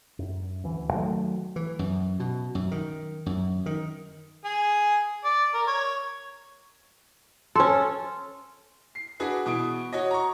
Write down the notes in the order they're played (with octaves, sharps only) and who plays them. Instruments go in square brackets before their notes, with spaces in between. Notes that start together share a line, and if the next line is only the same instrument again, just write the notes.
[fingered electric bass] F#2
D2 E3
D#3 F#3 G#3 A3
[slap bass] E3
F#2
B2
F#2
D#3
F#2
D#3
[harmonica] G#4
D5
A#4
C#5
[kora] C#4 A4 [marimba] C6
[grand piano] C7
D4 F#4 G#4 B4
B2 E3 D#6 D7
F#4 C#5 D#5
A#5 C#6